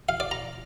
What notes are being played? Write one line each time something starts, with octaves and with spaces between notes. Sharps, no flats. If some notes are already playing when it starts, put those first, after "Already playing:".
F5
D5
A#5